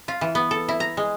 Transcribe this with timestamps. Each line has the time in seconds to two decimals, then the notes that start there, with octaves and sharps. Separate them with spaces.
0.08 F4
0.21 E3
0.35 B3
0.51 A4
0.69 E4
0.80 A#5
0.97 G#3